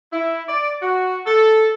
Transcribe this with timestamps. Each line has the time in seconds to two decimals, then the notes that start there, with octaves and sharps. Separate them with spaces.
0.13 E4
0.49 D5
0.82 F#4
1.27 A4